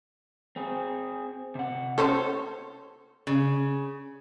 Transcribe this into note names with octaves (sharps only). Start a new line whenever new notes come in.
C4 G#4
C3 F#5
C#4 A4 C5 C#5
C#3